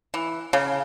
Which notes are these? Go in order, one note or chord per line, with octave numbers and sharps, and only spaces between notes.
E3
C#3